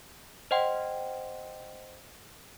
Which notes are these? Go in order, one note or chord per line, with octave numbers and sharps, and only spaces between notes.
C5 D#5 F#5 G5 C6